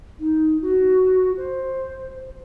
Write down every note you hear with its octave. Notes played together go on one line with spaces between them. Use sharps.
D#4
F#4
C5